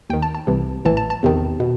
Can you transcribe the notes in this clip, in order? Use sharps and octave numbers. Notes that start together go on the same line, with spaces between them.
D#2 D#3 G5
A5
A5
C2 C3 E3
A1 A2 E3 A5
A5
A5
E2 C3 D#3
B2